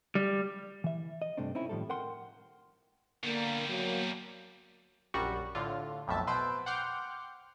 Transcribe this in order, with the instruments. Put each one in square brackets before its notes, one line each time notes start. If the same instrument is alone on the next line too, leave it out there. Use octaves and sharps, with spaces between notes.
[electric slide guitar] G3
[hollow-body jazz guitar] E3 E5
D#5
G2 C3 A3 C4 D4
C4 C#4 D#4 E4
A2 D#3 F3 G3 A4
A#4 F#5 G5 C6
[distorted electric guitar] B2 G3 [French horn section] D3 A#3
[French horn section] F#3 A#3
[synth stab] A#1 F#2 G3 F#4 C#6
A2 D3 F4
B1 F2 A2 E5 A5
B2 B4 C5 E6 D7
F#5 G5 C6 D6 F6 G6